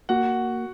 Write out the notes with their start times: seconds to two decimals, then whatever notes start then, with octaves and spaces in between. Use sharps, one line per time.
0.09 A#3 F#4 F#5